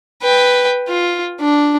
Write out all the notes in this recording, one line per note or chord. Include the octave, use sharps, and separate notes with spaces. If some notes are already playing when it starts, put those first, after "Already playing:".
B4 G5
F4
D4